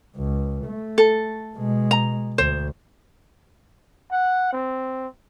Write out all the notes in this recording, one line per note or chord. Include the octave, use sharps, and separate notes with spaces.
C#2
A3
A4
B2 G#3
A#5
D2 C5
F#5
C4